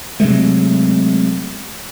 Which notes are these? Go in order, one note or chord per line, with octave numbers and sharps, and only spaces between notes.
C3 F#3 G#3 A3